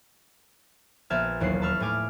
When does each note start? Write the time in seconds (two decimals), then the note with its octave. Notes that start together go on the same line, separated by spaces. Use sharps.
1.10 A#1 B3 E5 A5 F6 G#6
1.40 E1 D#2 F#3 E4 C7
1.62 A5 B5 C#6 E6 F6
1.80 A2 A3 G#5 D6 F6